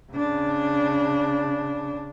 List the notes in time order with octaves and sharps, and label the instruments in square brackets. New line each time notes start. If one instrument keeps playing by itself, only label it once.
[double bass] C#3 D4